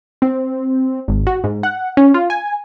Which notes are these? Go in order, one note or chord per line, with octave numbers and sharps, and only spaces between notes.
C4
G#1
F#4
G#2
F#5
C#4
F4
G#5